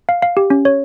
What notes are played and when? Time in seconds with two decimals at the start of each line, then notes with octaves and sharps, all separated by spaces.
0.09 F5
0.22 F5
0.37 G4
0.50 C#4
0.65 C#5